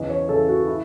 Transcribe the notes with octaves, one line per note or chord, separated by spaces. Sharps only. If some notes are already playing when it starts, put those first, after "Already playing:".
Already playing: E2 C#3 E3 D#5
C#5
E2 C#3 E3 A4
F#4
E4